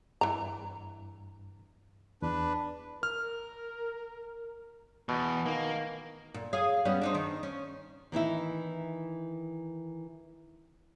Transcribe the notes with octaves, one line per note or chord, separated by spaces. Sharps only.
G2 E3 A#5
E2 D4 B4
A#4 F6
E2 B2
D#3 A#3
A#2
G#4 C#5 F5
G3 B3 C#4
D4 D#4 C5
D#3
C#4
D#3 E3 D#4 E4